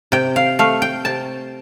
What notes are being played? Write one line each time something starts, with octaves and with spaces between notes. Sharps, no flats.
C3 G5
F5
A3 F5
G5
C3 A5